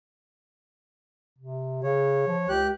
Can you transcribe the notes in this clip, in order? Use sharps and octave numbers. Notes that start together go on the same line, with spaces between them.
C3
C#3 C#5
F3
C#2 G4 F#6